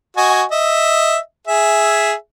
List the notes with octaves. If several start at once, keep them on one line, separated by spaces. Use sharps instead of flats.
F#4 D#5 G#5
D#5 E5
G#4 E5